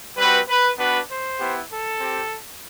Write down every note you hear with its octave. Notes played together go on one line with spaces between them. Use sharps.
G3 C4 F#4 B4
B4
B3 D4 F#4 B4
C5
B3 E4 G4
A4
C4 G4